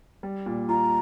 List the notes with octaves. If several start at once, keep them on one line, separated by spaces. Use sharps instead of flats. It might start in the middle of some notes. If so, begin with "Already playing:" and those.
G3
A#2
F4 A#5